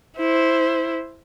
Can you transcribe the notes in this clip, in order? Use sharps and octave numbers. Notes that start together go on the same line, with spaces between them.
E4 C5